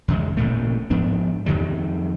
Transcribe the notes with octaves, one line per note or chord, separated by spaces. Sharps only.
E2 C#3 G#3
A1 A#2 C#3 A3
G#2 F3 B3 D4
F2 D#3 F#3 G3